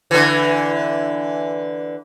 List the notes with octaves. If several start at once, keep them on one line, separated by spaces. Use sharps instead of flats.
D3 E3